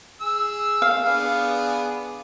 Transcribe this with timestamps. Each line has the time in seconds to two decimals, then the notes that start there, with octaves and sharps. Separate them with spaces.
0.21 G#4 E6
0.82 F5
1.05 B3 D4 G#4